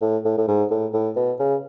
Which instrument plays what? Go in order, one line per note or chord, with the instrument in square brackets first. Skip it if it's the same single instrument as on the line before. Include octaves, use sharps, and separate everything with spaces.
[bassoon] A2
A2
A2
G#2
A2
A2
B2
C#3